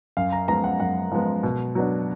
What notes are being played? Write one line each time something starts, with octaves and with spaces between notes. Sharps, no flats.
F#2 F5
A#5
F3 G#3 B3 A#5
F#5
F#2 F#5
F3 G#3 B3
B2
F#3 B3 D4